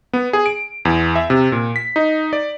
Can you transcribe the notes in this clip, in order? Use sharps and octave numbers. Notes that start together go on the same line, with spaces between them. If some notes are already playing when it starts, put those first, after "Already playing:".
B3
G#4
D7
E2
E5
C3
A#2
B6
D#4
D5